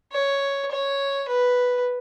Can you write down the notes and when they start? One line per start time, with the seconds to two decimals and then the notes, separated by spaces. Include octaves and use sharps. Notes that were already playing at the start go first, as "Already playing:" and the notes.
0.12 C#5
0.71 C#5
1.28 B4